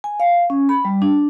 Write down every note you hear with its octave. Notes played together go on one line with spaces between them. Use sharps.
G#5
F5
C#4
B5
G3
D4